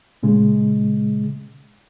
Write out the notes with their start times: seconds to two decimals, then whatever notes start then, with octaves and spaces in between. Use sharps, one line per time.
0.23 A#2 C#3 G#3